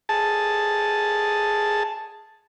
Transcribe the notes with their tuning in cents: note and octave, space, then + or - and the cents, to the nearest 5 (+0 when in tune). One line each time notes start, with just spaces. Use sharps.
G#4 +0 A5 +0